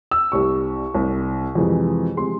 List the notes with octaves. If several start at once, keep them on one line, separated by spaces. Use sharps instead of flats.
E6
C2 C3 G3 C#6
C2 C3 G3
F2 C3 E3 G#3
C3 E3 G#3 C6